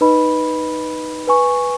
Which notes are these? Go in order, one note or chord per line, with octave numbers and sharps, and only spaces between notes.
D#4 B4 D#5 B5
B4 G#5 C#6